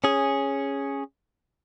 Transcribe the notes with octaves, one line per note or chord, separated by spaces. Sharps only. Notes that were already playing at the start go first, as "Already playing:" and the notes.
C#4 G#4